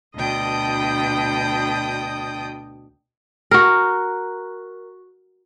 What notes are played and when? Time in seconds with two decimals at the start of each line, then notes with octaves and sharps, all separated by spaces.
0.16 D2 B2 D4 D#5 G5 D#6
3.51 F#4 A#4